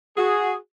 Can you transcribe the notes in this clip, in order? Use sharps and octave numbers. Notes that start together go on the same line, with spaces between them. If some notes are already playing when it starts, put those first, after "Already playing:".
F#4 G#4